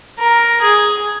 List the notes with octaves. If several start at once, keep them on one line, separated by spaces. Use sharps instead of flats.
A#4
G#4